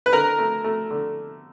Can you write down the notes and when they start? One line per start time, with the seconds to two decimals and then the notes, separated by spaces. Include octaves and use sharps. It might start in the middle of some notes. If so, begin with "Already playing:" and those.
0.06 B4
0.13 D3 A#4
0.38 A3
0.64 A3
0.91 D3